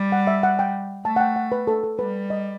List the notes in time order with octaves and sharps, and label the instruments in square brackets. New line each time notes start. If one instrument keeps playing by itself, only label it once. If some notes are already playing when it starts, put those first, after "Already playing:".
Already playing: [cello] G3
[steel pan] F#5
E5
F#5
G5
[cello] A3 [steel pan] A5
[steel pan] F#5
G5
F#5
B4
A4
A4
[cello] G3 [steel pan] B4
[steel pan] D#5